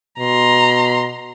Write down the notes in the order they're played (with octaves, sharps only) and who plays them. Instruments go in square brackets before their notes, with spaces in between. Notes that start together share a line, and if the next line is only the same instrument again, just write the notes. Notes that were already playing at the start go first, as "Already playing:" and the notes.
[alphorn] B2 [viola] A#5 C6